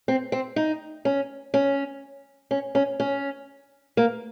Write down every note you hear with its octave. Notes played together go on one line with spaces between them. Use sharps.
C4
C4
D#4
C#4
C#4
C#4
C#4
C#4
A#3